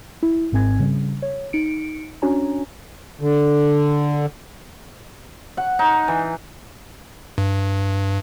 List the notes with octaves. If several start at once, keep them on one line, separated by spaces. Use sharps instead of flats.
E4
G#1 G#2 C4 G#5 G#6
C#3 G3
C#5
D#4 C#7 D7
C#4 D4 F#4 C#5 G#5 A#5
D3
F#5
D#4
E3
G2